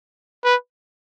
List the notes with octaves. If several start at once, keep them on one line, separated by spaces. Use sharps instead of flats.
B4